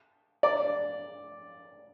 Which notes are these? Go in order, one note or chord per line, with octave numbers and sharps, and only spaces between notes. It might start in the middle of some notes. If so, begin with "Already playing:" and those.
D5